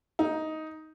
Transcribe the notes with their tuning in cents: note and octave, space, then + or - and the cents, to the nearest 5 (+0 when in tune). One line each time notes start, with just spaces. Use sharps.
D#4 +10